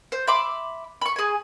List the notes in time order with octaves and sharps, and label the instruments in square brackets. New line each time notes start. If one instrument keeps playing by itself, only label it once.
[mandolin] C5
E5 B5 C6 D6
B5 C#6
G#4 G#5